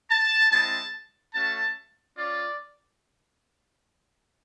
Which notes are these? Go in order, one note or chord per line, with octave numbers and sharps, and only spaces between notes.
A5
G#3 C4 E4 A5
A3 C#4 F#4 A5
C#4 F4 D5